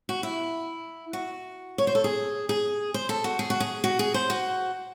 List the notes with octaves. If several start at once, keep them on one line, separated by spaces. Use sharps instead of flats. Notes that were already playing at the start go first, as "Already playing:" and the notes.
F#4
E4
F#4
C#5
C5
A4
G#4
G#4
C5
A4
F#4
G#4
F#4
G#4
F#4
G#4
C5
F#4